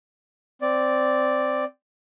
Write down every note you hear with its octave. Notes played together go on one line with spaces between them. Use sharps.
C4 D5